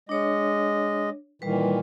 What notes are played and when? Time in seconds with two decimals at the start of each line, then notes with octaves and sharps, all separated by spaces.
0.09 G#3 D4 C#5 D#5
1.42 A#2 D#3 E3 G3 B4